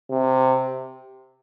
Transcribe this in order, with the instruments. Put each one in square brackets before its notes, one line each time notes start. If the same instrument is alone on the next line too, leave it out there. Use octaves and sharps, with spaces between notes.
[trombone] C3